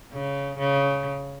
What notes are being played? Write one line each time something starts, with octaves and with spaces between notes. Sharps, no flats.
C#3
C#3